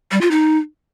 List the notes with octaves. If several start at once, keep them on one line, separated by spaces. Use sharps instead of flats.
G3
F4
D#4